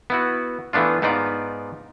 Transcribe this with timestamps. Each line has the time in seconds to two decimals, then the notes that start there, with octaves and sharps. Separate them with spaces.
0.10 B3 E4 F#4
0.73 E3 A3 B3 D4 F4
1.02 G#2 B3 D#4 F4 D5